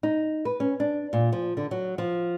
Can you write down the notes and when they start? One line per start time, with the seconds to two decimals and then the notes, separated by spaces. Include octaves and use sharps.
0.03 D#4
0.45 B4
0.60 C#4
0.80 D4
1.13 A#2
1.32 F3
1.57 D3
1.71 F#3
1.98 F3